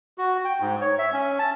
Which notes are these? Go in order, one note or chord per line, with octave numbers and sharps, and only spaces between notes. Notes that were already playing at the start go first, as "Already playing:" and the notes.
F#4
G5
G#2
C#5
E5
C#4
A5